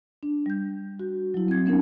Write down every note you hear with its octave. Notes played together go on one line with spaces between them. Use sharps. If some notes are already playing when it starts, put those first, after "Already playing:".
D4
G3 G6
F#4
F#3 E4
C4 G#6
A#3 B3 C#4 D#4 A#4